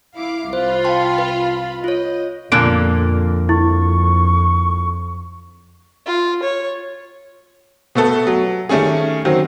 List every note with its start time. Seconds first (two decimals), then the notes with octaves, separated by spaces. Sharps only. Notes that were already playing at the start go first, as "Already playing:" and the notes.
0.17 E4 F5 D6
0.53 C2 F4 C5 B5
0.84 G5 A5 C6
1.18 B4
1.84 F4 C#5 D#5
2.52 F2 A#2 D3 A#3 F#6 D7
3.49 E4 C#6
6.06 F4
6.43 C#5
7.95 B2 A3 B3 A4
8.27 F#3
8.69 D#3 G3 A3 C#4 G#4
9.25 D#3 F#3 C4